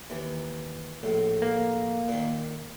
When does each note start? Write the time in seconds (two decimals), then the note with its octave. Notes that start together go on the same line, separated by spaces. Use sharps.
0.10 D#2 E3
1.03 A#1 A2
1.42 A#3
2.08 A#2 D#3